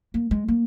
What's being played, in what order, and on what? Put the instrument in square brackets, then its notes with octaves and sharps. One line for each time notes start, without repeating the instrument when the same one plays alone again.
[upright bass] A#3
G#3
A#3